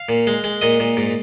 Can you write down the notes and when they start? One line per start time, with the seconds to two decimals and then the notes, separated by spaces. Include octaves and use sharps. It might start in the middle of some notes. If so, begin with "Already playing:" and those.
Already playing: F5
0.09 A#2
0.27 G#3
0.44 G#3
0.61 A#2 D#5
0.80 A#2
0.97 G#2